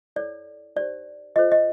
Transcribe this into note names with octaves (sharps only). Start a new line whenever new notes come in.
E4 A4 C#5 D5
D#4 G4 C5 D5
F4 A4 C5 D#5
D#5